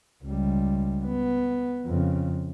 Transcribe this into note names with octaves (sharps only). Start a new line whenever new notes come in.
C#2 G3
B3
F2 C#3